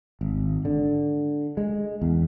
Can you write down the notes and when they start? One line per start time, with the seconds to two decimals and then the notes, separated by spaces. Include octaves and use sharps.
0.21 G#1
0.65 D3
1.57 G#3
2.02 E2